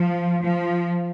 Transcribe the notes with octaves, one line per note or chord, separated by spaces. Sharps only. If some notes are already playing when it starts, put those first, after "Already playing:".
Already playing: F3
F3